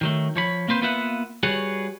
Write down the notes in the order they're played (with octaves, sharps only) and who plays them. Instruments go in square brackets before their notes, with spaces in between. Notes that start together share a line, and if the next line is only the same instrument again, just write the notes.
[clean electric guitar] D#3 F#3 A3
F3 C#5 B5
A#3 C4 B4 C5
A#3 B3 F4 B4 E5 F#5
G3 F#4 G#4 B4 C#5 F#5